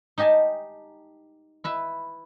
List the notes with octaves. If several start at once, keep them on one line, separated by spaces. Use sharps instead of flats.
D#4 G4 D#5 G#5 A5
E4 B4 E5